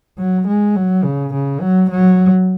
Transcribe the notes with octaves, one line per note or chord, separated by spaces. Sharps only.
F#3
G#3
F#3
C#3
C#3
F#3
F#3